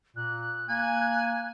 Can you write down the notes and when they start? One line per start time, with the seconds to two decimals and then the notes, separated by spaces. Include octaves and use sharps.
0.16 A#2 F#6
0.69 A#3 G#5